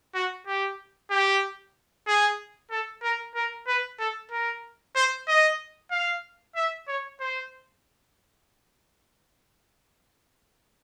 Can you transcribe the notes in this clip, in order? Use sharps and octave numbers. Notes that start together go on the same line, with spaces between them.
F#4
G4
G4
G#4
A4
A#4
A#4
B4
A4
A#4
C5
D#5
F5
E5
C#5
C5